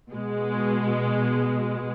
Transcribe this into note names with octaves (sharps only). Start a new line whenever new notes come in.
B2 G#3